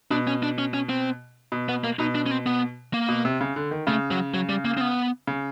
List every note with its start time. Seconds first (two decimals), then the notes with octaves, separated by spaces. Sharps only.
0.11 B2 D4
0.27 C#4
0.43 D4
0.58 C#4
0.74 C#4
0.89 C4
1.52 B2
1.69 B3
1.84 A#3
1.99 B2 D#4
2.15 D4
2.26 C#4
2.31 C4
2.46 B3
2.94 A#3
3.09 B2
3.25 C3
3.41 C#3
3.56 D3
3.71 D#3
3.87 C#3 A3
4.11 F#3
4.34 F#3
4.49 G3
4.65 A#3
4.77 C4
4.81 B3
5.27 C#3